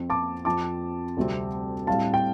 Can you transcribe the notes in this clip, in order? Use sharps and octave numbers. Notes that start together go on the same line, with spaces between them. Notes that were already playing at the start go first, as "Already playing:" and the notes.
Already playing: F2 F3 C4
A5 D6
F2 F3 C4 A5 D6
D2 C3 G3 C4
A2 G3 C4 F5 A5
G5